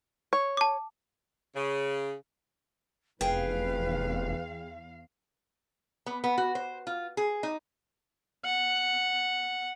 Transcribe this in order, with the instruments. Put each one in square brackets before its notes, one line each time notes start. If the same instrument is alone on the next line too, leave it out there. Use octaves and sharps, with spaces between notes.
[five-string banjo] C#5
[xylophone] A5 D6
[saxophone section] C#3
[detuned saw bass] F1 [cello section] E2 F5 [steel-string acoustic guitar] G#4 G5 [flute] B4
[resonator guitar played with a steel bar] B3
B3
F#4
C5
F4
G#4
D#4
[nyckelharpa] F#5